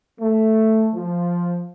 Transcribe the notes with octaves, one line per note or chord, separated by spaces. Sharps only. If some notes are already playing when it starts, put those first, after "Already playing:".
A3
F3